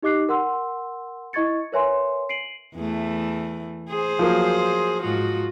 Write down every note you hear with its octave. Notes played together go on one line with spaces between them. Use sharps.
D#4 G4 D#5 D6 F#6 C7
A#4 F#5 C6 E6
E4 D#5 C#6 G#6 A6 C#7
A#4 B4 C#5 E5 G#5 C6
C7 D7 D#7 F#7
E2 E3 A3
G#4 C5
F3 F#3 A#3
G#2 F4 F#4